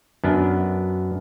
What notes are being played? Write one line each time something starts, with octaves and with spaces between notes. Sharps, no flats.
F#2 B3 D4